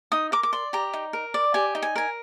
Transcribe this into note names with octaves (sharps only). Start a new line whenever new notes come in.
D#4 D#6
A#4 D6
D6
D5 C6
G4 A#5
D#4
A#4
D5
G4 G#5
D#4
G#5
A#4 G#5